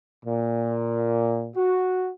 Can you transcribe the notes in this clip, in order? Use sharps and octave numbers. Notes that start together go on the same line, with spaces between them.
A#2
F#4